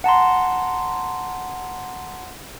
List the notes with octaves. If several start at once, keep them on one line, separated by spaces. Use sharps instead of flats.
F#5 A5 A#5 C6